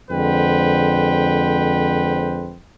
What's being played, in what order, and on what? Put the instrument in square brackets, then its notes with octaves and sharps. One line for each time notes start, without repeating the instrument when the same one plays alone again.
[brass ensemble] F2 D3 G#3 B4 C5 G5